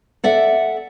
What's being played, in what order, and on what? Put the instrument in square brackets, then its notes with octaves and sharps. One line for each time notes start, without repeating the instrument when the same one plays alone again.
[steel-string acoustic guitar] A4 D5 E5 F#5